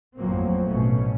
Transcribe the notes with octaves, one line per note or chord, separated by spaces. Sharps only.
A1 F2 F3 F#3 A#3 C4
A1 B2 A3 C#4